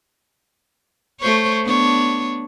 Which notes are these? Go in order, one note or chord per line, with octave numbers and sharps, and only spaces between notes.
A3 C5 C#5
B3 D4 C#5